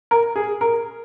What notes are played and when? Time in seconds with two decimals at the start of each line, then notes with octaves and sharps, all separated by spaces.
0.11 A#4
0.36 G#4
0.61 A#4